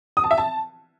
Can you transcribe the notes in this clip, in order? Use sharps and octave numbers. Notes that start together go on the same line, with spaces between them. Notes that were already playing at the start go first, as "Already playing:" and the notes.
D#6
A5
E5
A5